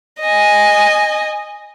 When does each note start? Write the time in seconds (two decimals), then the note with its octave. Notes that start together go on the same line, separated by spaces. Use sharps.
0.21 D#5 G#5